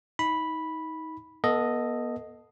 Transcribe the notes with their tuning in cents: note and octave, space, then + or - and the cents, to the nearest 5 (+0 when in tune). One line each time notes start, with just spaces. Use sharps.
D#4 +25 B5 -5
B3 -35 A4 +0 D#5 +0